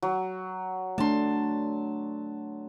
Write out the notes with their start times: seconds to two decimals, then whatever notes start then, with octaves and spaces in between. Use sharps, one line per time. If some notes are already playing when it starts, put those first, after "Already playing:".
0.02 F#3
0.98 A3 D4 A5 C6